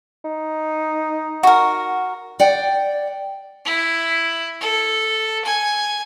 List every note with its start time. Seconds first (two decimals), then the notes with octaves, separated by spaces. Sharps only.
0.25 D#4
1.43 F#4 A#4
2.40 D5 F#5 G5
3.65 E4
4.61 A4
5.45 G#5